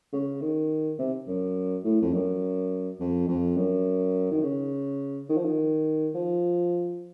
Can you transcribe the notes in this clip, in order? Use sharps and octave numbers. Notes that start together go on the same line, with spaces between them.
C#3
D#3
C3
F#2
A2
F2
F#2
F2
F2
F#2
D#3
C#3
D#3
F3
D#3
F3